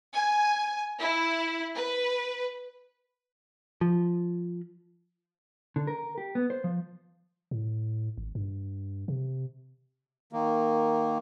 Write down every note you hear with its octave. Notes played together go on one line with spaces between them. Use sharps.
G#5
E4
B4
F3
D3
A#4
G4
B3
C5
F3
A2
G#1
G2
C3
D#3 A#3